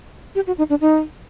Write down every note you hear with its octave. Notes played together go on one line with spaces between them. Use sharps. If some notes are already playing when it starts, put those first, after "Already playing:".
G4
F#4
D#4
D4
D#4